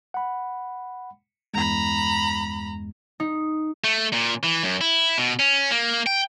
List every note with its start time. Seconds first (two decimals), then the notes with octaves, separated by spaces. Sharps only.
0.14 F#5 B5
1.54 E2 G2 G#3 A#5 B5
3.20 D#4
3.84 A3
4.13 A#2
4.43 E3
4.63 F#2
4.81 E4
5.18 B2
5.39 C#4
5.71 A#3
6.07 G5